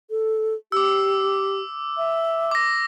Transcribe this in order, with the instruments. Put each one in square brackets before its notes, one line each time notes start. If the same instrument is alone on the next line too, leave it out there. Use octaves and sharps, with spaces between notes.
[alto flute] A4
[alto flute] G4 [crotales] D6 E6
[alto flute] E5
[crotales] D6 A#6